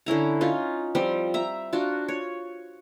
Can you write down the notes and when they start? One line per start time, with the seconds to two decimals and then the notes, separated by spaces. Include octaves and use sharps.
0.06 D3 C#4 E4 A#5
0.41 C#4 D#4 F4
0.95 F3 G3 C4
1.34 E5 A#5
1.73 D4 F4 F#4
2.08 C#5